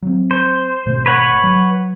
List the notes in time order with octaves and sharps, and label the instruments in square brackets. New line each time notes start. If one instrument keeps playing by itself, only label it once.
[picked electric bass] F#3 C4
[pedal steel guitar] C5
[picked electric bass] G#1 B2 A3
[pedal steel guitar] B4 C#5 F#5
[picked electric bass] F#3